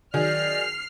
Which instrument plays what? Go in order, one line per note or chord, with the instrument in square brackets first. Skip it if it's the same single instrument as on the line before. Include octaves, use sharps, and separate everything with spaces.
[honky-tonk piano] D#3 F#3 G#4 [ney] D5 [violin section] F6 C7